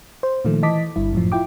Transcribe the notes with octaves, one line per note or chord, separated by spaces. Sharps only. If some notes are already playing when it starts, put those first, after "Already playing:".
C5
A#2 D#3 F3 A3
E3 D#5 A5 D6 B6
G1 G2 E4
F#2 A2 F3
E4 F4 G5 D6